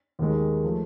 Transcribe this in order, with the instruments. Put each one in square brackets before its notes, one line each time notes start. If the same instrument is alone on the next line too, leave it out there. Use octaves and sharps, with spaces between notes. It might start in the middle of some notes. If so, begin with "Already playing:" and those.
[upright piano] D#2 D#3 G#3
F3 A3